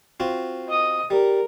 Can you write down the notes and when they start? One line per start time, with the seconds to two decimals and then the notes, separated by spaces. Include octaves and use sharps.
0.20 C4 F4 F#4
0.69 D#5 D#6
1.10 G3 A#4